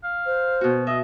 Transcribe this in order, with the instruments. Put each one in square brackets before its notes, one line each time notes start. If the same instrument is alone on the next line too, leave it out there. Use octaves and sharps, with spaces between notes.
[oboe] F5
[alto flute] C5
[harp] B2 F#4
[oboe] D#5 [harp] E5